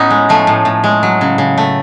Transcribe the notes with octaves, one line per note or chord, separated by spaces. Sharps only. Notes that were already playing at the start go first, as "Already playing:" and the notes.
Already playing: A2 B3 C#4 D#4
G#3
F3 A3
A2
A2
G#3
F#3
C#3
C#3
A3